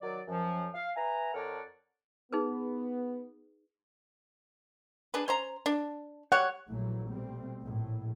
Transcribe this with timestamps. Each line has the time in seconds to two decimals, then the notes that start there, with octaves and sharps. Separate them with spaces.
0.02 D#3 F#3 D5
0.28 F#2 F3
0.74 F5
0.96 B4 E5 G#5 A#5
1.34 F2 A4 A#4 C#5 D5 F#5
2.33 B3 D#4 G#4 B4
5.14 D4 G#4 B4
5.28 C#4 C5 A#5
5.66 D4
6.32 G3 C#5 F#5
6.68 A#1 A#2 E3 F#3 A3
7.07 B2 G3 A3 C4
7.61 A#1 A2